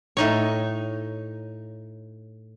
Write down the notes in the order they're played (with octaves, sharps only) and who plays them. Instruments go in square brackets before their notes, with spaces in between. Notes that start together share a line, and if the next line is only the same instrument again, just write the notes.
[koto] A2 D#4 C#5